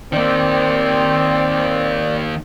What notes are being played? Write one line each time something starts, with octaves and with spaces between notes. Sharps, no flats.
D#3 A#3 C4 D5